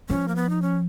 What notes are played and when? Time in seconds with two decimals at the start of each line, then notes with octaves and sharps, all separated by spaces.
0.09 F3 C#4
0.28 A#3
0.36 B3
0.50 D#4
0.62 C#4